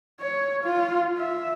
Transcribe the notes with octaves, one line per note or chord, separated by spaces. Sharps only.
C#5
F4
E5